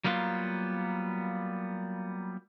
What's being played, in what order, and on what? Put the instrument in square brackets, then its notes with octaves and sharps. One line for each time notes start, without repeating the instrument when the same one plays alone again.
[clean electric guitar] F#3 G3 A#3 B3 F4